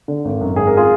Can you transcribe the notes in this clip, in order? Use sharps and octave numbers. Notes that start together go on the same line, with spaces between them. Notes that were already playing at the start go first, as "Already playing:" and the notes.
D3
G#1
F#2
G#1 G#4
A#4
F4 G#4